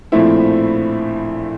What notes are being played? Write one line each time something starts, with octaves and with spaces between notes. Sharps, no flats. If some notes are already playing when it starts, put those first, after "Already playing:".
A#1 A2 F3 A3 C4 E4 E5